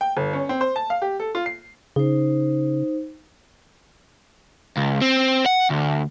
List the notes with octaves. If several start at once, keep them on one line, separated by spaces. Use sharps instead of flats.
G5
G1
C#4
C4
C5
A5
F5
G4
A4
F4
C7
C#3 D#4 C5
C#2
C4
F#5
D2